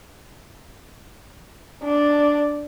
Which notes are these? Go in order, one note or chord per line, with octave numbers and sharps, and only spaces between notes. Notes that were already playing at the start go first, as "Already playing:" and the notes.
D4